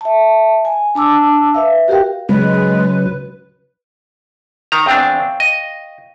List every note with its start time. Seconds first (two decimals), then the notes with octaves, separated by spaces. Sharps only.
0.01 E5 A5
0.65 G#5
0.95 D4 A5 D6 E6
1.54 B4 E5 F5
1.88 F#4 G4 A#4 F5 G5
2.29 C#3 F#3 G#3 B4
4.72 D#3 A#5
4.86 E2 C4 D4 F5 G5 C#6
5.40 D#5